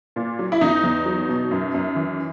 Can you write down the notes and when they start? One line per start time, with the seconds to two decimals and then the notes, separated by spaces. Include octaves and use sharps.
0.16 A#2
0.39 F#3
0.52 E4
0.61 E2 D#4
0.83 E2
1.06 F#3
1.29 B2
1.51 F#2
1.74 F#2
1.96 E3